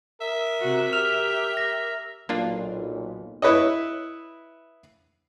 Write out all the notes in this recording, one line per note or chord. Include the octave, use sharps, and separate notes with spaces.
A#4 E5
C3 F#4
G4 F6 F7
A#6
B1 A#2 A#3 D4 F4
E4 B4 C#5 D#5